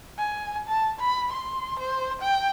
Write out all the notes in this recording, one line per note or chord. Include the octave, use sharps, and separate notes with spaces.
G#5
A5
B5
C6
C5
G5